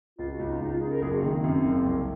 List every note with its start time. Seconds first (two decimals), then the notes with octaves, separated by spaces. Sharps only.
0.19 C#2 F4
0.32 F#4
0.39 C#2
0.47 D#4
0.60 C#2 D#4
0.71 F4
0.81 C#3 G#4
0.92 A#4
1.02 F#1 G#4
1.12 F#4
1.23 D#3 A#3
1.33 C4
1.44 F#2 C4
1.65 F#1
1.86 C2